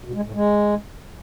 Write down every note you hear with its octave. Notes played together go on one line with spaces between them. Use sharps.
B2
G#3
A2
G#3